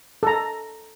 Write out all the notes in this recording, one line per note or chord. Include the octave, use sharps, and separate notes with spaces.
A4 A#5